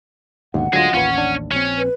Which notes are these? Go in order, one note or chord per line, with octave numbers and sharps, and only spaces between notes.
D#2 G#2 B2 D3 F#5
D2 G#2 D3 F#3 F4 G#4 D#5
A1 D#2 C#4 F4 B4
D4
A#1 C4 C#4
B4